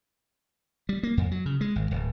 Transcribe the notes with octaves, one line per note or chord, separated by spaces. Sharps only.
G3
A#3
F2
F#3
C#3
G#3
G#1
D1